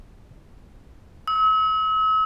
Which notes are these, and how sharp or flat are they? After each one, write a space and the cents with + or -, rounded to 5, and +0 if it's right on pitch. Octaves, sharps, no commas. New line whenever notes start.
E6 -45